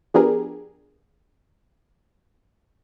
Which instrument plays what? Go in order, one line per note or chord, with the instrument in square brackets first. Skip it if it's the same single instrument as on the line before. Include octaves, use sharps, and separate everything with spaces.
[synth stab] F3 B3 D4 G4 G#4 A#4